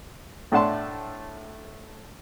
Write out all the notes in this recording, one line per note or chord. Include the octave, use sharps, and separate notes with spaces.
A2 A3 D4 F#5 A5 C6